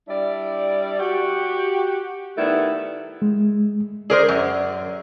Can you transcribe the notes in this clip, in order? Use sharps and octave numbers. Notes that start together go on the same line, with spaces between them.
G3 D4 E4 D5
F#4 G4
D#3 G3 A3 B3 E4
G#3
G#4 A#4 C5 D5
F#2